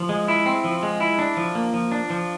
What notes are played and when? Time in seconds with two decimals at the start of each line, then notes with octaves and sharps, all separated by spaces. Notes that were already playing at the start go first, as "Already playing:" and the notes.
Already playing: F3
0.09 G#3
0.28 E4
0.46 C4
0.64 F3
0.83 G#3
1.00 E4
1.19 D4
1.37 F3
1.55 A#3
1.74 F3
1.92 D4
2.10 F3